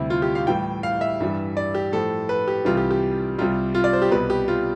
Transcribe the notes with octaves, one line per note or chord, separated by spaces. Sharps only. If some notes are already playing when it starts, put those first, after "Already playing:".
Already playing: D2 C3 G3 E4
F4
G4
F5
A2 E3 G3 G5
F5
E5
G2 E3 G3
D5
G4
A2 F3 A4
B4
G4
C2 C3 E3 G3 F4
G4
G4
C2 C3 G3 F4
F4
D5
C5
G4
C2 B2 G3 B4
G4
F4